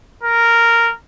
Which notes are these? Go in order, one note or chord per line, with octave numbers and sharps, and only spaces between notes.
A#4